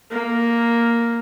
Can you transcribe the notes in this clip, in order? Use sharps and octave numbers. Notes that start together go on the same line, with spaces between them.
A#3